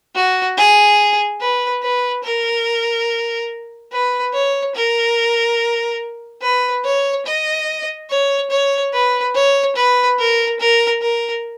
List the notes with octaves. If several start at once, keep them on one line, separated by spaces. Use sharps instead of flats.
F#4
G#4
B4
B4
A#4
B4
C#5
A#4
B4
C#5
D#5
C#5
C#5
B4
C#5
B4
A#4
A#4
A#4